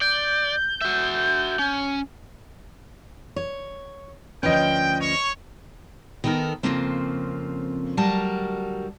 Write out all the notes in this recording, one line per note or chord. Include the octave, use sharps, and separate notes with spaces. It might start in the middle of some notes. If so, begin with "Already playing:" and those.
D5 G6
F#4 E5
C#4
C#5
D2 F3 C#4 B4 D#5 G5
C#5
D#3 B3 D#4 A4 A#4
F2 A#2 C#3 F3 A#3 C4
D2 F#3 G3 F#4 A#4 A5